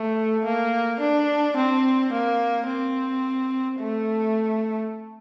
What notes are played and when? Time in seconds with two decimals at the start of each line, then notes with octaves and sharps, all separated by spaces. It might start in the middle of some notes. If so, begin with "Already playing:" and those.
Already playing: A3
0.45 A#3
1.01 D4
1.57 C4
2.13 A#3
2.67 C4
3.80 A3